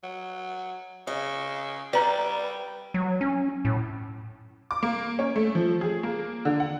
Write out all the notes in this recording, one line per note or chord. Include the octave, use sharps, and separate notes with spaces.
F#3
C#3 D#5
G3 B4 D5 A#5
F#3
C#4
A2
D6
A#3
C#4
A3
F3
G#4
A#3
D3
F#5